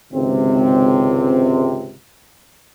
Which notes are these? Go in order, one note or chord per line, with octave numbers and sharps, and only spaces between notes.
G#1 C#2 C3 C4